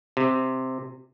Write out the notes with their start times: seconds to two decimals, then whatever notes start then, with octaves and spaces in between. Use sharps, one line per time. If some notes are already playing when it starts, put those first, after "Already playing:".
0.17 C3